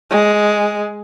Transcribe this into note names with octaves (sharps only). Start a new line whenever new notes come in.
G#3